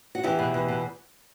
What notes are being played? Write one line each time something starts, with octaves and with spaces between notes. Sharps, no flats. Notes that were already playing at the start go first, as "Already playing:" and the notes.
F#4
E2 E4 G4
B2
E2
B2